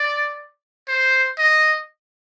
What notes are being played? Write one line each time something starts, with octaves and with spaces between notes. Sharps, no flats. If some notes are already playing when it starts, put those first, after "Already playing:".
Already playing: D5
C5
D#5